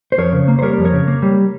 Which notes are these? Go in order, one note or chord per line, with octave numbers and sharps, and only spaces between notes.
C5
F2 A#4 C#5
C#3
A#3
C5
G3 A#4 C#5
F2
A#4 C#5
C#3
A#3
G3